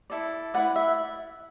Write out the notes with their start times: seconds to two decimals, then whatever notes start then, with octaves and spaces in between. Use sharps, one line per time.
0.10 E4 A4 D5
0.54 E4 B4 D5 F#5
0.76 E5